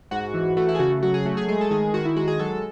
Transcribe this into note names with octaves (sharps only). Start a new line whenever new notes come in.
G#2 F#4
E3
A3 F#4
E4
G#4
C#3 F#4
F#3 F#4
G#4
A3 F#4
G#4
G#3 G#4
A4
D#3 G#4
D#3 F#4
E4
G#3 F#4
G#4
F#3 A4